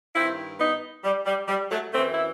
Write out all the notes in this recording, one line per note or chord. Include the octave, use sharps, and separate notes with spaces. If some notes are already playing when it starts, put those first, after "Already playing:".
G2 D#3 C4 E4
B3 D#4
G3
G3
G3
F#3 A3
F#2 E3 A3 C4
E4